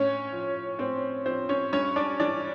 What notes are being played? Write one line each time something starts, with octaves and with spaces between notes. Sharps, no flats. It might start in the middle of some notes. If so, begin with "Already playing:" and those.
Already playing: A2 C#4 C#5
F3
A2 C4 C5
F3 C4 C5
C#4 C#5
G2 C#4 C#5
D4 D5
E3 D4 D5